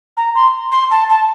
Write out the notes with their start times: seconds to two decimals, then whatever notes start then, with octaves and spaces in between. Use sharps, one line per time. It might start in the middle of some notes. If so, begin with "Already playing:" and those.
0.17 A#5
0.35 C6
0.72 C6
0.91 A5
1.09 A5